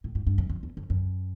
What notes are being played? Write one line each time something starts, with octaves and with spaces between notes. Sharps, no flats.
A2
G#2
G2
F#2
F2
E2
F2
F#2